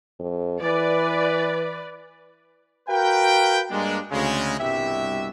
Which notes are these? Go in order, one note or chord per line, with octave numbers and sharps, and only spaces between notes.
F2
E3 B4 D5
F#4 A#4 B4 F5 G5
G2 G#3 A#3 D4
D2 C#3 G#3
C2 G2 B2 G4 E5